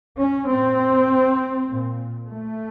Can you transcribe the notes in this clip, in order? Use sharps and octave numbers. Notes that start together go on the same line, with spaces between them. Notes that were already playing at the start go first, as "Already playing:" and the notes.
C#4
A#2 C4
A#2
A3